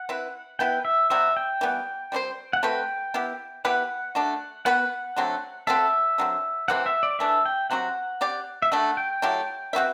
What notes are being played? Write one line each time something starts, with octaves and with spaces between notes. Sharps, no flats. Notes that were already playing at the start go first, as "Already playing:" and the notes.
Already playing: F#5
C4 E4 B4
B3 E4 B4 G5
E5
C3 G3 C4 F#4 E5
G5
E3 G3 B3
G3 C4 F#4 C5
F#5
A3 C4 F#4 B4 G5
B3 E4 G4
B3 E4 G4 B4 F#5
A3 D4 F#4
B3 F#4 B4 F#5
D3 F#3 A3 C4
C4 F#4 A4 E5
D3 F#3 C4
C3 E3 G3 C4 F#5
E5
D5
E3 A3 D4 E5
G5
C3 F#3 C4 F#4 F#5
C4 G4 D5
E5
A3 D4 F#4 F#5
G5
F#3 A3 E4 G4
C4 F#4 B4 E5